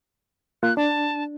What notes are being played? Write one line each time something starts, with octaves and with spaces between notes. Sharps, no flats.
A#3 F4 F#6
D4 A5